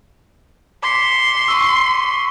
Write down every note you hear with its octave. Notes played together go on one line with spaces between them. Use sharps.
C6 D6 B6 C#7
C#6 E6